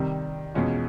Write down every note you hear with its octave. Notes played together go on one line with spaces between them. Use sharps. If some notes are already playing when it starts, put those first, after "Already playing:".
Already playing: C3 D#3 G3
E2 B2 G#3 C#4 F4